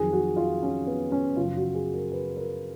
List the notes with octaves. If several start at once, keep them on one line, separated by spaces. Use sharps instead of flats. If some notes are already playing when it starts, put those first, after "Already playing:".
Already playing: F2 D#3 F#3 G#4
F#4
F4
C#4
B3
C#4
F#2 C#3 F3 F4
F#4
G#4
A#4
B4
A#4